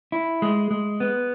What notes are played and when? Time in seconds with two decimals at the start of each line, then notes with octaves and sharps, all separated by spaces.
0.12 E4
0.42 G#3
0.71 G#3
1.00 B3